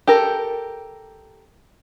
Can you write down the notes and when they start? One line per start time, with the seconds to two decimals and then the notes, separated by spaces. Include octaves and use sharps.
0.07 G4 A4 A#4